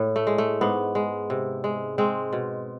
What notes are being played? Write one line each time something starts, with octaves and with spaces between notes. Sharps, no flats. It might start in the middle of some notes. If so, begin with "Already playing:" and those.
Already playing: A2
A3
G#3
A3
G#2 B3
G#3
C3
G#3
G#3 C4
B2